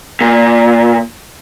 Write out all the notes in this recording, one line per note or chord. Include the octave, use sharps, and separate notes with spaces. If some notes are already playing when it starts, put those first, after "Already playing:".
A#2